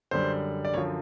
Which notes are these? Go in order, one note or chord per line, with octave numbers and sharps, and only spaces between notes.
F#2 D3 G3 C5
D5
F#2 D3 F3 C#5